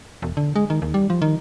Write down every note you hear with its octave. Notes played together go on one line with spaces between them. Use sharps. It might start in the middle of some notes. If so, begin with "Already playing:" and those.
E1
D3
G#3
D#3
D#2
G3
F3
D#3